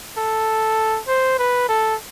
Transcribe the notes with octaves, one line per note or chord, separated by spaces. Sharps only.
A4
C5
B4
A4